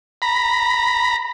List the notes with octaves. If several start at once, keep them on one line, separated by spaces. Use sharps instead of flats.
A#5 B5